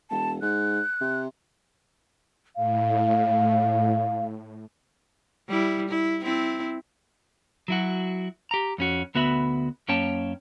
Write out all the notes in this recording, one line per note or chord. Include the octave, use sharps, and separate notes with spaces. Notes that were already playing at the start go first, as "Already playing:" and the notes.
E1 A5
G#2 F#6
C3
A2 F5
G3 E4
E4
C4 E4
F#3 E4 F#4
G4 A#5
F2 C#4 F#4
D2 B3 F#4 E5 B5
F#2 A#3 C#4 C#5 G5 A5